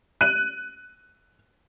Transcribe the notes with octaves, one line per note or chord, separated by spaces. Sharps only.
F#6 D#7